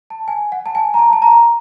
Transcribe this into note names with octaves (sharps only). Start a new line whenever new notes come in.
A5
G#5
F#5
A5
G#5
A#5
A5
A5
A#5